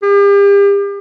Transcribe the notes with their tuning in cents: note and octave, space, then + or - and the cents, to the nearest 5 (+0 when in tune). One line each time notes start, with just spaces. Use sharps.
G4 +40